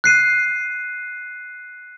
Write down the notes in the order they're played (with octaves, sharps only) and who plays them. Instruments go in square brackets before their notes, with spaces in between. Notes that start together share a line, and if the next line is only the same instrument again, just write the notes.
[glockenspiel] F#6 C7 D#7